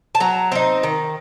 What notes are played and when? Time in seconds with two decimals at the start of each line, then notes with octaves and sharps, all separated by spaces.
0.15 A5
0.20 F#3 A#5
0.52 C4 D#4
0.83 D#3